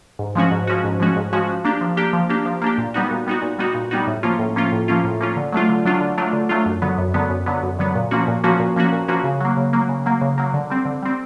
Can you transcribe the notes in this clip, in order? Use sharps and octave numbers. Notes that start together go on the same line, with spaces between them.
G#2
F3 G#3 C#4 F#4
G#2
F3 G#3 C#4 F#4
G#2
F3 G#3 C#4 F#4
G#2
F3 G#3 C#4 F#4
F3
A#3 D4 G4
F3
A#3 D4 G4
F3
A#3 D4 G4
F3
A#3 D4 G4
A#2
G3 B3 D#4 F#4
A#2
G3 B3 D#4 F#4
A#2
G3 B3 D#4 F#4
A#2
G3 B3 D#4 F#4
A2
F3 A#3 C#4 F4
A2
F3 A#3 C#4 F4
A2
F3 A#3 C#4 F4
A2
F3 A#3 C#4 F4
D3
F#3 A3 D4 F4
D3
F#3 A3 D4 F4
D3
F#3 A3 D4 F4
D3
F#3 A3 D4 F4
F#2
D3 F#3 B3
F#2
D3 F#3 B3
F#2
D3 F#3 B3
F#2
D3 F#3 B3
A#2
F3 A#3 C#4 F#4
A#2
F3 A#3 C#4 F#4
A#2
F3 A#3 C#4 F#4
A#2
F3 A#3 C#4 F#4
C#3
F#3 A#3
C#3
F#3 A#3
C#3
F#3 A#3
C#3
F#3 A#3
D3
G3 C4
D3
G3 C4